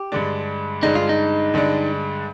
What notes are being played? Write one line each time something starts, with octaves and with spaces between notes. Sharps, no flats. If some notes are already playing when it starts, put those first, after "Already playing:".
Already playing: G4
G2 D3 G#3 D4
G2 D3 G#3 D4 D#4
F4
D#4
G2 D3 G#3 D4